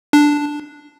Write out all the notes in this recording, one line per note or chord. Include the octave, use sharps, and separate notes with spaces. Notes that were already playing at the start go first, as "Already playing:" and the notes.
D4